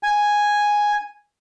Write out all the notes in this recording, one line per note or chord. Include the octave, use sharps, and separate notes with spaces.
G#5